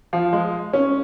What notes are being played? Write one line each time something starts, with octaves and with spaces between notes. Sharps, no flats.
F3
G#3
C#4